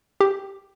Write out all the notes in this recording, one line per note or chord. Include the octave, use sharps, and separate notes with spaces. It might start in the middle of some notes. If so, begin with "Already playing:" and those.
G4